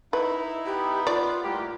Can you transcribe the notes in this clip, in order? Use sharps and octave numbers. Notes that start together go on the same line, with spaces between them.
D#4 E4 B4
B3 G4
F4 D5
A2 G3 A#3 G4